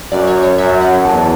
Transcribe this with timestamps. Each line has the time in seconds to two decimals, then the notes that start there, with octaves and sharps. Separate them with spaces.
0.12 F#2 D5
0.28 C#5
0.43 C#5
0.58 F#2 E5
0.81 F#5
1.05 E2 A5